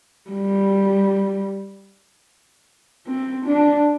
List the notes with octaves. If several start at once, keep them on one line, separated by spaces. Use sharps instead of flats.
G3
C4
D4